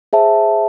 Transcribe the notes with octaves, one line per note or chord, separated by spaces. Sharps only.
G#4 C5 E5 A5